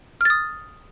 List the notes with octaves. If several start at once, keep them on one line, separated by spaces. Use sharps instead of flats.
D#6 F6 A6